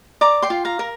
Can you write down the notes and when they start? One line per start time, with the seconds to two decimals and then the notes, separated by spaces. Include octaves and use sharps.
0.21 D5 A#5 D6
0.42 G5 C6
0.50 F4
0.65 F5 A#5
0.79 A#4